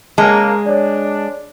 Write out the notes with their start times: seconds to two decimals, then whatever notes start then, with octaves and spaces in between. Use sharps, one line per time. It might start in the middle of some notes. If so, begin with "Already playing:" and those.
0.18 C#3 G#3 A#3 A5
0.66 D4 C#5 D5